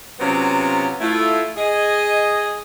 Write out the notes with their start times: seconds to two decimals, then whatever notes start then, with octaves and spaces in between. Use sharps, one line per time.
0.20 C3 F#3 B3 C#4 F4 A#5
1.01 A3 E4 F4
1.57 G#4 D#5